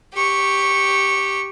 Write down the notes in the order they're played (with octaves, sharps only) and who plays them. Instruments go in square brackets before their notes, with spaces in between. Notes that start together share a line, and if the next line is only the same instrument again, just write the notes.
[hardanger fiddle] G4 C#6